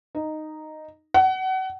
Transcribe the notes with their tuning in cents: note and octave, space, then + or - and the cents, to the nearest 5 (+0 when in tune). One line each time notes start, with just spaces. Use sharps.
D#4 -5
F#5 +30